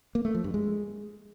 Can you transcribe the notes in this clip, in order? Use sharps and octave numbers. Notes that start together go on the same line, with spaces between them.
A#3
A3
F3
G2
G#3